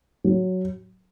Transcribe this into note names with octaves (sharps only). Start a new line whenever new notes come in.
F#3